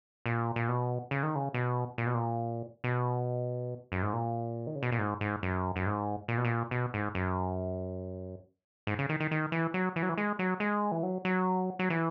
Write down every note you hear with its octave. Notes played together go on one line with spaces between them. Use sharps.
A#2
A#2
B2
C#3
D#3
C#3
B2
A#2
B2
A#2
B2
F#2
G#2
A#2
D#3
C#3
B2
A#2
G#2
G#2
F#2
F#2
G#2
A#2
B2
A#2
B2
G#2
F#2
G#2
C#3
D#3
D#3
D#3
E3
F#3
E3
F#3
E3
G#3
F#3
G#3
E3
F#3
F#3
F#3
E3